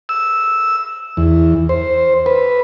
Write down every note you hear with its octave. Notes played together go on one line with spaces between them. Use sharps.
E6
E2
C5
B4